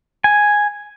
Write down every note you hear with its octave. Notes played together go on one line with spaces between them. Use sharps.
G#5